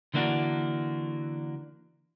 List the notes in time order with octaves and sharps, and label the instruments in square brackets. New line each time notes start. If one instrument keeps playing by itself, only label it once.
[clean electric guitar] D3 E3 A#3 D4 F#4